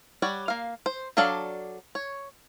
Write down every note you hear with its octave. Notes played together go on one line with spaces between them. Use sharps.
G3 C#5 D5 F#5
A#3 F5
C5
F#3 D4 A4 D5 F5
C#5